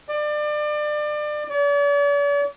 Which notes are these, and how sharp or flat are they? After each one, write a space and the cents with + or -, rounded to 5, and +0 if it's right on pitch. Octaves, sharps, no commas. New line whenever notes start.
D5 +30
D5 -45